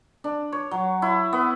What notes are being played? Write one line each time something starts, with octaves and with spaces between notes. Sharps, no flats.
D4
C#5
F#3
E4
B3